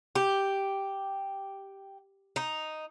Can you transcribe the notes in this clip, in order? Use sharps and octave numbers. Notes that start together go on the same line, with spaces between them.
G4
D#4